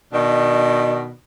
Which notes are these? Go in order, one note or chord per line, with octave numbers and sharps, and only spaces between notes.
B2 D#3 D4